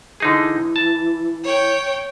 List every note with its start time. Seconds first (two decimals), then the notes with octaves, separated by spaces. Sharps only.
0.20 D3 E3 D#4 G#4
0.76 A5
1.44 C#5 G5